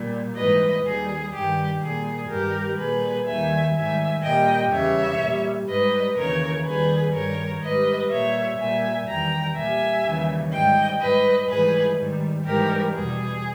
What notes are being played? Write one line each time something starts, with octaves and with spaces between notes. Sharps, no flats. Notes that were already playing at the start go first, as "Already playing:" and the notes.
Already playing: A#2 G3
G#2 E3 G3 B4 D#5
D#2 D#3 G3 G#4
G2 D#3 G3 G4
A#2 G3 G#4
G2 D#3 G3 G4 A#4
A#2 G3 G#4 B4
D#2 D#3 G3 E5 G#5
G#2 D#3 G3 E5 G#5
A#2 G3 D#5 G5
E2 C#3 G3 C#5 E5
A#2 G3
G#2 G3 B4 D#5
D#2 C#3 E3 A#4 C#5
D#2 D#3 G3 G#4 B4
G2 D#3 G3 A#4 C#5
G#2 G3 B4 D#5
A#2 G3 C#5 E5
A#2 G3 E5 G#5
E2 D#3 G3 G5 A#5
A#2 G3 E5 G#5
D#2 C#3 E3 G3
G#2 G3 D#5 G5
G#2 G3 B4 D#5
G#2 E3 G3 G#4 B4
G#2 D#3 G3
G#2 E3 G3 G4 A#4
E2 B2 G3 G#4